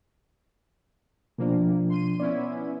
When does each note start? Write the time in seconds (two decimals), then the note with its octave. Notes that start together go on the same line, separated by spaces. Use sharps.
1.38 B2 F3 A#3 D4
1.89 C6 D#7
2.20 B3 C#4 E4 D5